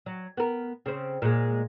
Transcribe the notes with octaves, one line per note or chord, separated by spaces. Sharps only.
F#3
B3 A#4
C#3 C4
A#2 G#3